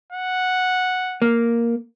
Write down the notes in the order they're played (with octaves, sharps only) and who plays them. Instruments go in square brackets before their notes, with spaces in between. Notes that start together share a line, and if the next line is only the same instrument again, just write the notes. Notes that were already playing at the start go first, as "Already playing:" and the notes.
[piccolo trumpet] F#5
[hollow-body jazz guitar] A#3